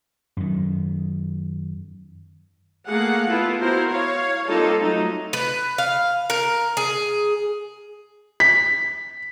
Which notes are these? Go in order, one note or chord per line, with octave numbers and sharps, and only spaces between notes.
F#2 D#3
A3 A#3 G#4 F5 F#5
B3 E4 F4 A4
B3 E4 F#4 A#4 C5
C#5 F5
G3 A#3 C4 D#4 F4 A4
F#3 A3 D#4
B4
F5
A#4
G#4
B6